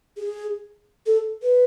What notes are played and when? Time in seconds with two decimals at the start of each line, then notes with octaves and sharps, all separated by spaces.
0.17 G#4
1.06 A4
1.42 B4